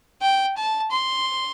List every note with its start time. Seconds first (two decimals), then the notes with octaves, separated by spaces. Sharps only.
0.22 G5
0.57 A5
0.91 C6